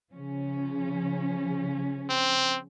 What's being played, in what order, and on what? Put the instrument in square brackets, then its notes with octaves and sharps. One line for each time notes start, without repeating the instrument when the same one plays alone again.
[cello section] C#3 F3 C#4
[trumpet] C4